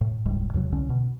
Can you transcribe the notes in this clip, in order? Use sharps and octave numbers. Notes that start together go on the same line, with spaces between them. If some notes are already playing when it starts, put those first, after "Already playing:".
A2
E1 C#2 G#2 G3
E2 C3 F#3
C2 D3 C#4
B2